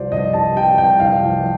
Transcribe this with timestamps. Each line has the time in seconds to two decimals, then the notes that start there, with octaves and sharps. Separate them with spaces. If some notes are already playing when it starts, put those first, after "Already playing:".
Already playing: C2 C3 F3 C5 D5
0.12 C2 D#5
0.33 C3 A5
0.56 C3 G5
0.78 C2 G5
1.00 C2 F5
1.23 F3